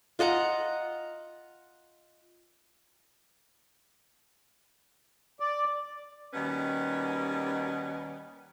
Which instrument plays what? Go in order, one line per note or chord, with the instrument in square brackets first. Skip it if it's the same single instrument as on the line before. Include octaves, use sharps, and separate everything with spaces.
[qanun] F4 D#5 F#5 A#5
[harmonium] D5
[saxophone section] D#2 B2 D#3 G3 C#4 B4